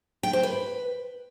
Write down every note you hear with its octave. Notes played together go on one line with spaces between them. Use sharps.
G5
C5
B4